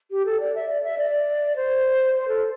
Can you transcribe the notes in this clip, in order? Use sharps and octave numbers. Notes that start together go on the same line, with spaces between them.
G4
A4
D5
E5
D5
E5
D5
C5
C5
A4